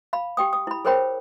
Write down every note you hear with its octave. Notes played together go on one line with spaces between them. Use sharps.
F5 B5
G4 G5 D#6
D#6
E4 B5
G#4 A#4 C5 C#5 G5 B5